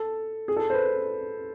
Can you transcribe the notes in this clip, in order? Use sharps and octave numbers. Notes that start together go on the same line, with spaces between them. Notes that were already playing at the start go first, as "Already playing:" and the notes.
Already playing: A4
G#4
A4
C5
B4